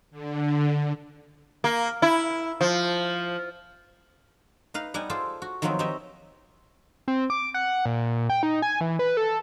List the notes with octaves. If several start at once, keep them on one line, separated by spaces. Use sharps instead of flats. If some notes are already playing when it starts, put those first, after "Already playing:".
D3
A#3
E4
F3
D#4 B4 F5
G3 B3 D#4 F#5 G#5
F4 G#4 A4 C5 D5
F#4
D#3 F3 F#3 B3 C4 F4
C4 D#4 G4 C#5 D#5 E5
C4
D6
F#5
A#2
G5
D#4
G#5
E3
B4
A4